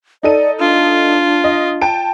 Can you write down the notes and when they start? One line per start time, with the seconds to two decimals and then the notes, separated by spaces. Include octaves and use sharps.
0.23 D#4 A4 D5 D#7
0.60 D4 F4
1.44 D#5
1.81 G5 A5 D7